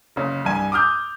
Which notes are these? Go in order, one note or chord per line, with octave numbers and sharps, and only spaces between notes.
F#1 C#3
C2 G2 G#5
D6 D#6 F6 G6